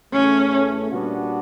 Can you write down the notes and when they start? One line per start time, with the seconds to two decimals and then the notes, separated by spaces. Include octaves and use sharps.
0.13 E2 C#3 E3 A3 C#4
0.90 A#2 G3 B3 D4 F#4